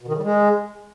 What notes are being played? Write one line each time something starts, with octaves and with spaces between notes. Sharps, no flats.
B2
D#3
C#3
G3
G#3